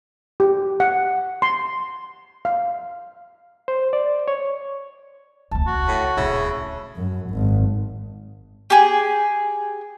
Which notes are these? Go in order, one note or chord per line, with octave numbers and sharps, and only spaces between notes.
G4
F#5
C6
F5
C5
D5
C#5
E1 D2 A5
C#2 F#4
A2 A5
D1 A#1 C#3 E4
F#2
G#1
G4 G#4